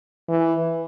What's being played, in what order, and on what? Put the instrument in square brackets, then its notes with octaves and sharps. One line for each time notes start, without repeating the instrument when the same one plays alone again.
[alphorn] E3